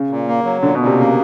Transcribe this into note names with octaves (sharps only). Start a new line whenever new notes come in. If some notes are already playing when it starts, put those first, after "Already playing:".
Already playing: C#3
A#2
A#3
F#3
A#2 D3
B2
A#2
C3
C#3 A#3